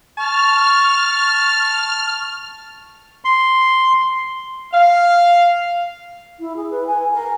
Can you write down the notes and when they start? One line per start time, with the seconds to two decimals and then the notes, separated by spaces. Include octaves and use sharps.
0.18 A5 C#6 F6
3.25 C6
4.73 F5
6.40 E4
6.56 G#4
6.70 B4
6.87 G#5
7.13 A#4